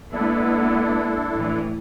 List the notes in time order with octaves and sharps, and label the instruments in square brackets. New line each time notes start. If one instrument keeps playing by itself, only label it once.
[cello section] G#3 A#3 B3 [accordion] D4 E4 A4
[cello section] A2 E3